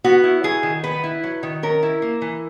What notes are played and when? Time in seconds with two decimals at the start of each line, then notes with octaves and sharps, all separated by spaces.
0.04 B3 F#4
0.24 E4
0.44 F#3 G#4
0.63 D#3
0.83 B3 B4
1.03 E4
1.24 F#3
1.43 D#3
1.63 C#4 A#4
1.83 E4
2.02 A#3
2.22 E3